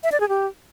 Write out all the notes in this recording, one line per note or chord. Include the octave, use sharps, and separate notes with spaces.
E5
D5
G#4
G4